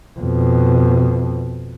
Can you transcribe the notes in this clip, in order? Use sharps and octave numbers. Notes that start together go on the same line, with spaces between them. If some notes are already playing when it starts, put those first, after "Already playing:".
F2 B2